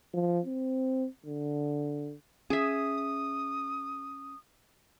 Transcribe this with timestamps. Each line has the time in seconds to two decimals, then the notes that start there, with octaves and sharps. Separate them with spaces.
0.14 F3
0.46 C4
1.26 D3
2.50 C#4 G#4 E5 D#6